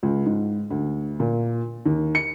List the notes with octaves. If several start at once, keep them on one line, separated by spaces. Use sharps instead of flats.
C#2
G#2
D2
A#2
D#2
C#7